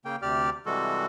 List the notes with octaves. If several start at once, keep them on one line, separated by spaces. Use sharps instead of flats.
C#3 A#3 G5
D2 C3 G4 D5 F6
C3 E3 G3 G#3 F#4 A4